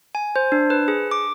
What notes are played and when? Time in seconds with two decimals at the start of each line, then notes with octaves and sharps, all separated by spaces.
0.15 G#5
0.36 C5
0.52 D4
0.70 B4
0.88 G#4
1.11 D6